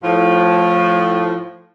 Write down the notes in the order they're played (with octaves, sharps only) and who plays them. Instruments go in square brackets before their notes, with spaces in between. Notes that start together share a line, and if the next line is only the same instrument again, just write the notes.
[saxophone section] A2 F3